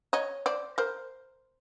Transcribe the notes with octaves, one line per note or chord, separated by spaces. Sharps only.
C#5 D#5
C5 D5
A#4 C5